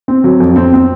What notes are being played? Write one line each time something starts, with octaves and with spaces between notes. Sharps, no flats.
C4
F#3
F2
C4
C4